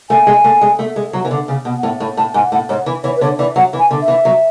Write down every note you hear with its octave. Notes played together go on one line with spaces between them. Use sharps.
A3 G#5
G#3
A3
G#3
A3
G#3
F#3
E3
D3
C#3
B2
A2
A2
A2 A5
G#2 G#5
A2 F#5
G#2 C#5
E3
E3 C#5
B4
D3 C#5
E3 D5
F#3 F#5
E3
G#5
D3
E5
E3
F#3